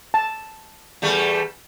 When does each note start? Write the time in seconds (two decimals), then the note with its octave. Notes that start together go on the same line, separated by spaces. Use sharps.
0.14 A5
1.02 E2 G3 A3